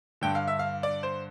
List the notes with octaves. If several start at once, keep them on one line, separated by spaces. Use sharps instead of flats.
G2 D3 G5
F5
E5
F5
D5
C5